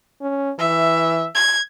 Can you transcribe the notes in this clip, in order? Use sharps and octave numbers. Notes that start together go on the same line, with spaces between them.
C#4
E3 E5
G#6